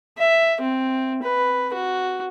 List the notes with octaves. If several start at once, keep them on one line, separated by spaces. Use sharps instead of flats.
E5
C4
B4
F#4